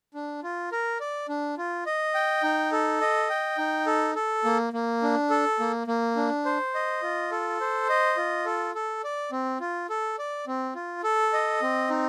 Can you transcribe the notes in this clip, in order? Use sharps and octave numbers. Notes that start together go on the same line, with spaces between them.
D4
F4
A#4
D5
D4
F4
D#5
G5
D#4
A4
D#5
G5
D#4
A4
A4
A#3
A#3
D4
A4
A#3
A#3
D4
C5
D#5
F4
A4
C5
D#5
F4
A4
A4
D5
C4
F4
A4
D5
C4
F4
A4
D#5
C4
D#4